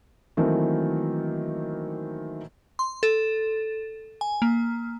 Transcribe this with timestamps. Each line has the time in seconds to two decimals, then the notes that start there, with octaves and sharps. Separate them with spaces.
0.37 D#3 E3 F#3 A3 A#3 C4
2.79 C6
3.03 A4
4.21 G#5
4.42 A#3